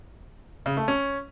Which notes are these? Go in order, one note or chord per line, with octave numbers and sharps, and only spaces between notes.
C#3
A3
C#4